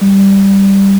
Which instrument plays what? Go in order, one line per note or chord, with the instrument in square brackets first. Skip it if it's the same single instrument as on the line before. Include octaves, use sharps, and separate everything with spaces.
[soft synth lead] G3